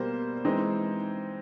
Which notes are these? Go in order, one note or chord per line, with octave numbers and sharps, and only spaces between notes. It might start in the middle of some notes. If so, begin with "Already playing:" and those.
Already playing: B2 G3 A#3 C5
E3 G#3 C4 D#4